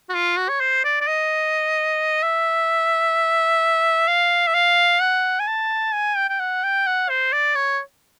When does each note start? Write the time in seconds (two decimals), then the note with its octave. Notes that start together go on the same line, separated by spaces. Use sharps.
0.09 F#4
0.14 F4
0.37 F#4
0.49 C#5
0.61 C5
0.84 D5
1.01 D5
1.08 D#5
2.23 E5
4.08 F5
4.48 E5
4.54 F5
5.01 F#5
5.40 G#5
5.48 A5
5.93 G#5
6.17 G5
6.30 G5
6.40 F#5
6.63 G5
6.86 F#5
7.09 C5
7.33 D5
7.55 C#5